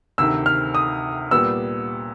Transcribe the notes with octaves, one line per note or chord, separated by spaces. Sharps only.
D2 C3 D#3 E6
F6
D#6
A#2 G3 B3 E6